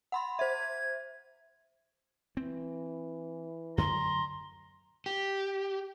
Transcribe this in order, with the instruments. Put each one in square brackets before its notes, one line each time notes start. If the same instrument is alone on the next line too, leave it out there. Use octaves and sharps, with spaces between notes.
[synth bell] F#5 B5 C6
[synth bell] C5 E5 [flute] G#6
[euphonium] E3 [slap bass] C4
[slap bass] F#2 D3 F#3 [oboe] A#5 [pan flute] C6
[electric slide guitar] G4